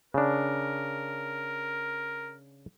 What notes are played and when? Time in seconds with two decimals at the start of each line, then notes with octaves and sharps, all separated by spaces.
0.14 C#3 D4 A#4